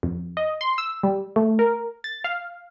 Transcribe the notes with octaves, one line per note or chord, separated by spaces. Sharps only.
F2
D#5
C6
E6
G3
A3
A#4
A6
F5